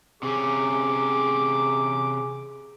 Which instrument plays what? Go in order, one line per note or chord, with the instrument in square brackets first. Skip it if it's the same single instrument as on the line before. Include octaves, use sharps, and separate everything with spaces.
[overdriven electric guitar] C3 C#4 [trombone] G#4 [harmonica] D6